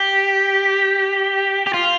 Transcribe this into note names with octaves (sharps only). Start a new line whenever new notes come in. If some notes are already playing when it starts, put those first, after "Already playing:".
Already playing: G4
G4
F4